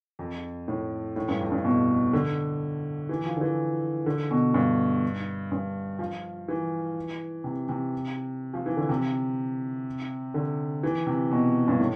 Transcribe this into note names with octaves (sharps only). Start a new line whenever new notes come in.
F2
A2
A2
G2
F2
G2
B2
D3
E3
F3
D3
E3
D3
B2
G2
G2
F3
E3
C3
C3
F3
E3
D3
C3
D3
E3
C3
B2
G2
A2